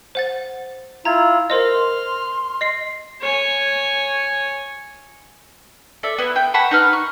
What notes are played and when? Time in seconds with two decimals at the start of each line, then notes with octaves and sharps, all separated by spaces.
0.15 C5 F#5 A6
1.05 E4 F4 A#5 G#6
1.50 A#4 C5 D#5 C6 F6
2.61 D#5 C7
3.21 C#5 G#5
6.03 A4 D5 E5
6.18 B3 E4
6.36 G5
6.54 F#5 A5 B5 C#6
6.71 D#4 B4 F6
6.93 C#6